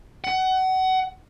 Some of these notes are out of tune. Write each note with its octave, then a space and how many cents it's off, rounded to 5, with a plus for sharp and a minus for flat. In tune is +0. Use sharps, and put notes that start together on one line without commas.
F#5 +25